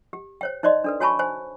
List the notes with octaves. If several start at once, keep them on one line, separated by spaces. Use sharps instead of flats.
G4
C5 C#5 G5
D#4 C5 D5 D#5 C6
D4 A4 B4
F#4 C#5 G#5 A5 B5 C#6
C5 G#5